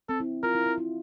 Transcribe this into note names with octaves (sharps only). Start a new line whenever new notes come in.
C4 A4
E4
F4 A#4
E4
E4
E4